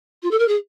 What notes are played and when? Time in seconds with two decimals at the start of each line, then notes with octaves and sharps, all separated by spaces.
0.23 F4
0.31 A4
0.39 A#4
0.48 G#4